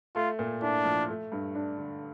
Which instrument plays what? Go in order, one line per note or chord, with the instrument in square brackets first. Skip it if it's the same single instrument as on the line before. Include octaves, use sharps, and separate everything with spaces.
[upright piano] A3 [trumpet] F4
[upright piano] A#2
[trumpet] D4 [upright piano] E4
[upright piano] F3
A3
G2
D4
D3